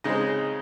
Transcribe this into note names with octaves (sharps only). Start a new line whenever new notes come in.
C#3 G#3 C4 D#4 D#5